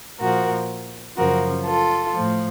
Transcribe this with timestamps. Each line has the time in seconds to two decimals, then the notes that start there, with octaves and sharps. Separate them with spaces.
0.20 A#2 F3 F#4 A#4
1.17 F#2 C#3 F3 F#4 A#4
1.66 F4 A4
2.15 A2 F3